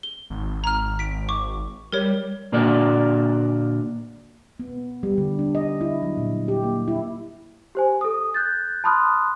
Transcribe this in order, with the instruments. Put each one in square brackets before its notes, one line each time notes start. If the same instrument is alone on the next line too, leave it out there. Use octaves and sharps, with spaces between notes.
[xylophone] G7
[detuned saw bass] G#1
[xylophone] A#5 F6
B6 D7
C#6 D6
[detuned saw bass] G3 [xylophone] A#4 C#5
[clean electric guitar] A#2 D3 A#3 F#4 D5
[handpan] B3
G3
D3
D4
D#5
E4
F#3
A#2
G4
A#3
E4
[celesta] G4 C5 G#5
A4 D#6
F#6 G6 A6
A5 B5 C6 D#6 F6 F#6